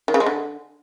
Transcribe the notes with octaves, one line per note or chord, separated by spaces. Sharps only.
D#3
C#3
G#3
D3